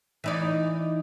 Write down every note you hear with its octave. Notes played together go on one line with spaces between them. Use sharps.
E3 D#4 D5